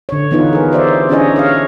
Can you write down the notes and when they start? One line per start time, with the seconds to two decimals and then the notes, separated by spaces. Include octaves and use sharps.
0.09 D3 C#5
0.31 E3 B3 D#4 F4 B4
0.53 G#4 A#4
0.72 G4 C5 D5 E5
1.09 C#4 D4 E4 G#4 C#5 D#5
1.36 C#5 F5